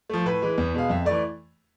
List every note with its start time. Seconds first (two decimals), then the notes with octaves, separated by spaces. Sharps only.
0.09 F3 A3
0.26 A2 B4
0.42 E3 G#3
0.58 E2
0.74 B2 G#3 F5
0.90 F2 E5
1.05 E3 A3 D5